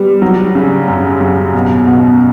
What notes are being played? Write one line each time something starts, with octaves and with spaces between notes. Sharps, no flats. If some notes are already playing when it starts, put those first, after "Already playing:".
Already playing: G3 B3
F#3
C#3
F#2
F#2
B2
B2